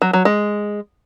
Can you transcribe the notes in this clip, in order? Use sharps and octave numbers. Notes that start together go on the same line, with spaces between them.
F#3
F#3
G#3